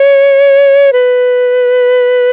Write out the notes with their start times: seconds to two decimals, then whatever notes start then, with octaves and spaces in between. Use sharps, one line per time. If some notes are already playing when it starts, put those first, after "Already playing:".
Already playing: C#5
0.93 B4